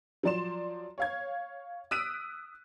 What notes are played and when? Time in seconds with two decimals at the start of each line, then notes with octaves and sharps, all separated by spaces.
0.23 F3 F#3 D5 C6 E7
0.98 C#5 F5 G#6
1.91 D#6 E6 F#6 B6 D7 D#7